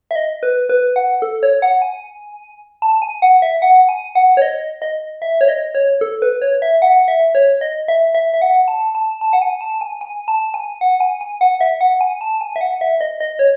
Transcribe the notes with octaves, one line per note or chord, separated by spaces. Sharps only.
E5
D#5
B4
B4
F#5
A4
C#5
F#5
G#5
A5
G#5
F#5
E5
F#5
G#5
F#5
C#5
D#5
D#5
E5
C#5
D#5
C#5
A4
B4
C#5
E5
F#5
E5
C#5
D#5
E5
E5
E5
F#5
A5
A5
A5
F#5
G#5
A5
G#5
G#5
A5
G#5
F#5
G#5
G#5
F#5
E5
F#5
G#5
A5
G#5
E5
F#5
E5
D#5
D#5
C#5